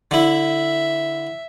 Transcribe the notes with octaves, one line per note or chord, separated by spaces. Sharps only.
D3 E4 E5